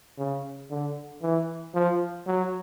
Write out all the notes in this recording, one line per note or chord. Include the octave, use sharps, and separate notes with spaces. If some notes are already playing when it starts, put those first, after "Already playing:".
C#3
D3
E3
F3
F#3